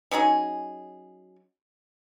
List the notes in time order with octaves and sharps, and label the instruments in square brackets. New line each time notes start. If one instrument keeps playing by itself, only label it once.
[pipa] F#3 C#4 D#4 G#4